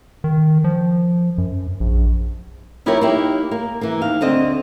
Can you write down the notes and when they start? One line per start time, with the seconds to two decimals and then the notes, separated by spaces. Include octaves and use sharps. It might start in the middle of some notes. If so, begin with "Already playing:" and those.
0.24 D#3
0.64 F3
1.38 F#2
1.80 A#1
2.86 F3 E4 F4 G4 A#4 C#5
3.01 A#3 D#4 E4 G4
3.51 A#3
3.81 E3 A#3
4.01 D#2 F5
4.21 D2 D3 C4 D#5